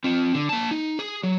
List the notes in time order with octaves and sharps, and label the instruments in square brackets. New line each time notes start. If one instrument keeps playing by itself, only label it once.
[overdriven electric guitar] C4 F4
D3
A#3 A5
D#4
G#4
F#3